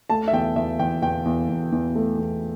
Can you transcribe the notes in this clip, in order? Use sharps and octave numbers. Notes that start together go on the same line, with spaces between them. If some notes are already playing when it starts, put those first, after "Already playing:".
A3 A5
E5
E2 G5
E2 E5
E2 G5
E2 G5
E2
E2
E2
A3
E2